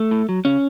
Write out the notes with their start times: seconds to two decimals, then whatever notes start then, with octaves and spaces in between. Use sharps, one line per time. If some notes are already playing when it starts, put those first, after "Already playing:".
Already playing: A3
0.11 A2
0.29 F#3
0.45 C#3 C#4